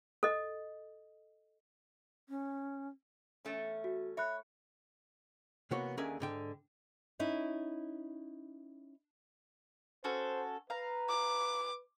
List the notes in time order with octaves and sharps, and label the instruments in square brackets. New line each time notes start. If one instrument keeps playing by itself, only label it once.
[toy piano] A4 D#5
[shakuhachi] C#4
[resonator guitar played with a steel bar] E2 A3 C#4
[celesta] F#4
[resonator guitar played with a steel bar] C#5 [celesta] E5 B5 F#6
[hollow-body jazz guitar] C3 E3 A#3 B3 F#4 C#5
D#2 D3 C#4 G#4 A#4 E5
G#2 D3 G5
[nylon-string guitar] C#4 D#4 E4
[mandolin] C#4 F#4 A4 [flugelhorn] C5
[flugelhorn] B4 [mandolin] F5 A#5
[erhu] D6